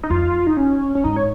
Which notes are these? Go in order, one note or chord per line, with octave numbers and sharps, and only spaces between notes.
D#4
F2 F4
D#4
C#4
C#4
G#2 D#4
C#5